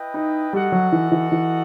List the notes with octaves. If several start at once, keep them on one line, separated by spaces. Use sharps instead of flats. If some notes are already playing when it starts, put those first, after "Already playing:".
Already playing: E4 B4 D#5 G5
D#4
G3 F#4 A4 D#5 F#5
F#3
E3
E3
E3